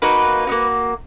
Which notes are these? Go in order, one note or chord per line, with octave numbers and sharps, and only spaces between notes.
A#3 D#4 F#4 B4
A#3 D#4 F#4